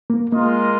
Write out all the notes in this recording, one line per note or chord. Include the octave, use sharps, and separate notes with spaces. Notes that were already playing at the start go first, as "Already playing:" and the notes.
A#3
G#3 A#3 F4 A#4 D#5